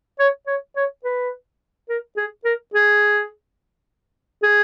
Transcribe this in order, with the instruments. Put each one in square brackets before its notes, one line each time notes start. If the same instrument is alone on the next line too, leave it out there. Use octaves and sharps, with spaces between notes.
[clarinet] C#5
C#5
C#5
B4
A#4
G#4
A#4
G#4
G#4